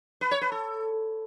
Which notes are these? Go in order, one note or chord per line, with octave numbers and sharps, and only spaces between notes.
B4
C#5
B4
A4